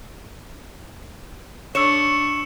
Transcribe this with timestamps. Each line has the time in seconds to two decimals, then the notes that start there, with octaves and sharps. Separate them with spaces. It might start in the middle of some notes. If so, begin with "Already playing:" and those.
1.75 D4 C#5 C#6 E6 C#7 E7